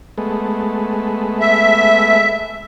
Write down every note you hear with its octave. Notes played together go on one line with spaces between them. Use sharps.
G#3 A3 B3
E5